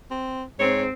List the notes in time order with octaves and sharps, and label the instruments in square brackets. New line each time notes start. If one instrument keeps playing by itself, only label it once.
[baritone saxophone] C4
[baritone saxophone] G#2 [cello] C4 [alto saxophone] C#5